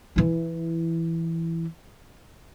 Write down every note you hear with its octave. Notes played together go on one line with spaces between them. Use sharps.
E3 E4